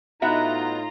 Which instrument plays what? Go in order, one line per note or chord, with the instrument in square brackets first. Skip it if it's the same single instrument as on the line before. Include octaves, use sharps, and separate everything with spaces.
[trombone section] A2 D#4 [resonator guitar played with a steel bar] B3 F#4 E5 [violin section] F4 A#5